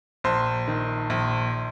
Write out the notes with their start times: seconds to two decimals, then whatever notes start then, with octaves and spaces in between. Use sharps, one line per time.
0.24 A#1 C5
0.68 D#3
1.10 A#1